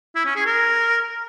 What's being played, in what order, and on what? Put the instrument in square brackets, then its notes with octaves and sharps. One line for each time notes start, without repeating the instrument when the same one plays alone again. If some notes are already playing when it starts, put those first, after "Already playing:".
[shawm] E4
C#4
G#4
A#4